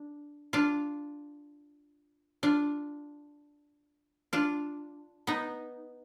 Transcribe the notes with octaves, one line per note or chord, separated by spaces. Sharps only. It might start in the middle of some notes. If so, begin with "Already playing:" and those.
Already playing: D4
D4 F4
D4 F4
D4 F4
B3 D#4